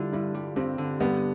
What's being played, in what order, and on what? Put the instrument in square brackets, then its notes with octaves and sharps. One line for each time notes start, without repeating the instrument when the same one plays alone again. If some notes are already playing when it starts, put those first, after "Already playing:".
Already playing: [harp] D3 G3 [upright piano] E4 F4
[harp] G2 [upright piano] E4
[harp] G3
[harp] G2 [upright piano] C4
[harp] D3
[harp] G2 [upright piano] B3